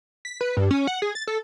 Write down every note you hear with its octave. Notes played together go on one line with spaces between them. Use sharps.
B6
B4
G2
C#4
F#5
G#4
A6
A4